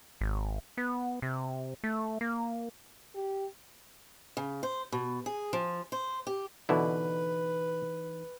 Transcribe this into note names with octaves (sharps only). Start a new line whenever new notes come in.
G#1
B3
C3
A3
A#3
G4
C#3
C5
B2
G#4
F3
C5
G4
B2 D3 E3 D#4 E4 B4